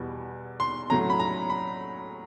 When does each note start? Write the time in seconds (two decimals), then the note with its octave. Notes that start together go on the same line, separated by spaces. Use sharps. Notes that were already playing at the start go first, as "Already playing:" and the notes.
Already playing: E2 B2 G3
0.60 C6
0.90 A2 F#3 A3 C#4 A#5
1.10 B5
1.20 A#5
1.50 B5